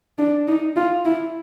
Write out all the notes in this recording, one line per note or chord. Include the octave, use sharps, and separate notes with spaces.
D4
D#4
F4
E4